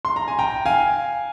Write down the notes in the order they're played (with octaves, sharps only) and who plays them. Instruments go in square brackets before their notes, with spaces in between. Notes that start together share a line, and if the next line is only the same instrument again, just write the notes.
[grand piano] C6
A#5
G#5
G5 A#5
F5 G#5